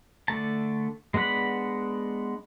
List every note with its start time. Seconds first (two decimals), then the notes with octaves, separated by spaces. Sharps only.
0.28 D3 A3 A5
1.14 G#3 B3 D4 F#5 B5